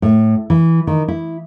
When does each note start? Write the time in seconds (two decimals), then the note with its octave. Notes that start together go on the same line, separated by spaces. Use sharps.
0.02 A2
0.50 E3
0.87 D#3
1.08 E4